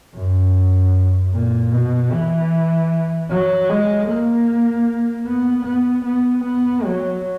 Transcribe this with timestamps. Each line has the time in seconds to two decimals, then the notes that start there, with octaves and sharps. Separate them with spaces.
0.14 F#2
1.33 A#2
1.72 B2
2.11 E3
3.30 F#3
3.69 G#3
4.08 A#3
5.26 B3
5.66 B3
6.05 B3
6.45 B3
6.84 F#3